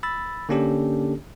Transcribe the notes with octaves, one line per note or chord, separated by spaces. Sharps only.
B5 E6 A6
D3 A#3 C#4 D4 G4 A4